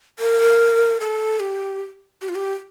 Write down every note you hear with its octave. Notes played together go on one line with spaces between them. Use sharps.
A#4
A4
G4
G4
F4
G4